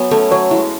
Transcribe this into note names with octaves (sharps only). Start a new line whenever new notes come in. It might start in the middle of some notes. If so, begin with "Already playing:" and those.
Already playing: F#3 B3 G#5
A3 C#4 A4
F#3 C#5
G#3 E4